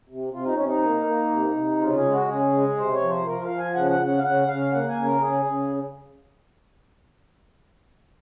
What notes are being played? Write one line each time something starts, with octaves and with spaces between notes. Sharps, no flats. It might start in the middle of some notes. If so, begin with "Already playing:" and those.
C3
C3 F4
D#4
C3 C#4
D#4
A#3
A#3
C3
C3
C#3 F4
G#4
G#3
F#4
C#3 G#4
G#3
C3 C5
C#5
F3
C5
F3 A#4
F5
F3
G#5
C#3 F#5
F#5
C#3
F#5
F5
C#3 F#5
C#3 F5
A#3 F#5
G#5
C#3
A#4
C#3 G#4
C#3